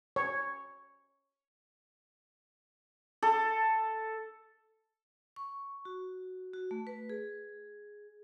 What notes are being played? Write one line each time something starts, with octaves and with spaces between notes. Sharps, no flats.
C#5
A4
C#6
F#4
F#4
A3
B4
G#4